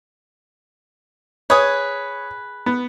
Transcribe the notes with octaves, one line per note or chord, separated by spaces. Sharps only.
G#4 B4 C#5 D#6
B3